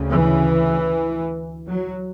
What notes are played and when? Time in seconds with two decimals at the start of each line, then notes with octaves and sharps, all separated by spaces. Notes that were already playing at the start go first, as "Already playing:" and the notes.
Already playing: D2 C#3
0.12 E3
1.67 F#3